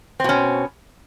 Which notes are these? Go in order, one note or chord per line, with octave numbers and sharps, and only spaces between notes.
B2 C4 C#4